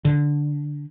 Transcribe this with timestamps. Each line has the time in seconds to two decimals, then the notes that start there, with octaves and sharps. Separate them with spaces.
0.05 D3